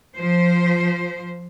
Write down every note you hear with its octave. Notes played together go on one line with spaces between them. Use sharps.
F3 C5